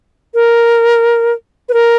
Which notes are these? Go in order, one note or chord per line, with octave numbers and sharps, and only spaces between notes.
A#4
B4
A#4